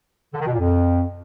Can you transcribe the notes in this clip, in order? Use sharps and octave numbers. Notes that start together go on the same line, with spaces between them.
D3
D#3
B2
A#2
F2